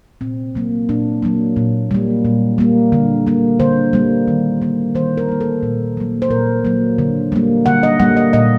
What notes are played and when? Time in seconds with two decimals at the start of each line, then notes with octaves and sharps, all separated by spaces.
0.21 A#2 C4
0.55 F#3 A#3
0.89 A#2 D4
1.22 F#3 A#3
1.56 A#2
1.91 G3 A#3
2.25 A#2
2.58 G3 A#3
2.92 D3
3.27 G3 A#3
3.60 D3 C5
3.93 G3 A#3
4.28 D#3
4.62 G3 A#3
4.95 D#3 C5
5.17 A#4
5.29 G3 A#3
5.41 A4
5.63 A#2
5.97 F#3 A#3
6.22 C5
6.30 A#2 A#4
6.65 F#3 A#3
6.98 D3
7.32 G3 A#3
7.66 D3 F#5
7.83 D#5
8.00 G3 A#3 F#5
8.17 D#5
8.33 A#2 D#5